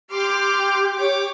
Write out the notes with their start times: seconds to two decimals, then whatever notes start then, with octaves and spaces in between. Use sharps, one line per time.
0.10 G4 C6 D6 F6
0.94 C#5 D6